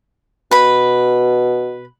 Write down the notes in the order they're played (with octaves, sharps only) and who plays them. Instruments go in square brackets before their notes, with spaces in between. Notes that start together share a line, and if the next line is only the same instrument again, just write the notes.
[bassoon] B2 [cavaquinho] B4 B5